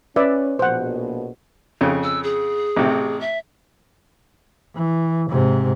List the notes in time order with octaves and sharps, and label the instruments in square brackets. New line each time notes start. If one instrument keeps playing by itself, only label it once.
[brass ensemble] C#4 [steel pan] B4 D5 E5
[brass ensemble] A#1 B2 [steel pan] C5 F#5
[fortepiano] F2 C#3
[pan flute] E6
G#4
[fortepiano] A1 C3
[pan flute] E5
[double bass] E3
G#2 C3